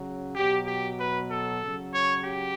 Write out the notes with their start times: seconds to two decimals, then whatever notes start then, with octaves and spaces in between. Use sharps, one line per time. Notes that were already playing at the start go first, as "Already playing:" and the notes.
Already playing: C#3 F#3
0.36 B2 F#3 G4
0.67 G4
0.99 B4
1.30 A4
1.62 C#3 F#3
1.94 C#5
2.24 G4